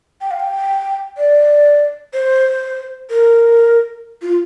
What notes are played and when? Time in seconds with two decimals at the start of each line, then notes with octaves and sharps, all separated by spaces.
0.21 G5
0.31 F5
0.40 G5
1.17 D5
2.13 C5
3.10 A#4
4.22 F4